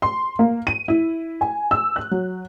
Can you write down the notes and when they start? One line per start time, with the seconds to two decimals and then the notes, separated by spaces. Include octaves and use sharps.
0.02 C6
0.39 A#3
0.67 D#7
0.88 E4
1.41 G#5
1.71 E6
1.96 F#6
2.11 F#3